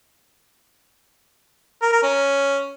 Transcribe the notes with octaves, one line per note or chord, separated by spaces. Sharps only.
A#4
A#4
C#4